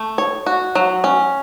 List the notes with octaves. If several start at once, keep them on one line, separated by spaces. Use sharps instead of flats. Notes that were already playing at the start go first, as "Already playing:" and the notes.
Already playing: A3
C#5
F#4
F#3
C#4